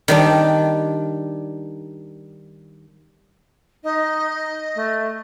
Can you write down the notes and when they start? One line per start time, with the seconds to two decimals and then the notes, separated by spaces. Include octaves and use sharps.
0.08 D#3 G3 D4
3.83 D#4 D#5
4.75 A3